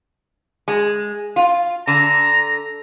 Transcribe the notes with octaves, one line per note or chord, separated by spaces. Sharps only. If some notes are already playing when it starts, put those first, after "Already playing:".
G#3
F4
D3 A#5